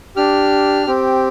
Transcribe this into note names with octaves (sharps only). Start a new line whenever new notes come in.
D4 G4 F6
C4 G4